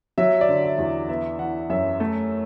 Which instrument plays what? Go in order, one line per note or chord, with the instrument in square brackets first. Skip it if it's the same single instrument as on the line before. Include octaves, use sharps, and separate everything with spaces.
[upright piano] F#3 E5
D5
D3
E5
E2
B3 E5
E3 F#5
F#2 E5
A3